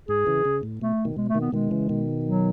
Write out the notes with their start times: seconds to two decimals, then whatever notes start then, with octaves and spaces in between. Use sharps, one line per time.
0.08 G#2 G#4
0.26 C#3 E3
0.45 C#3
0.63 A2
0.81 B2 A3
1.05 B2 D#3
1.17 B2 G#3
1.29 A3
1.35 B2 D#3
1.41 B3
1.52 B2 D#3 G#3
1.71 C#3 E3
1.89 B2 D#3
2.25 F#3